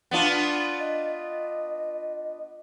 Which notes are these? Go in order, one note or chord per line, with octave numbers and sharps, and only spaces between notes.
B3 D4 F4
D#5